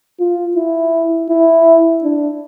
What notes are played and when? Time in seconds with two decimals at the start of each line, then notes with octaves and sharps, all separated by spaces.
0.20 F4
0.56 E4
1.30 E4
2.03 D4